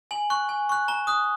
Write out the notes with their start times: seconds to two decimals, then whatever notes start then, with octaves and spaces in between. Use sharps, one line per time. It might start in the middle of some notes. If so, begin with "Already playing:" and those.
0.11 G#5 F#7
0.30 C#6 F#6
0.49 G#5
0.69 C#6 F#6
0.88 A#5 G7
1.07 D#6 F#6